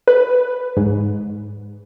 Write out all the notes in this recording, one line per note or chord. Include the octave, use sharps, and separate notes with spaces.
B4
G#2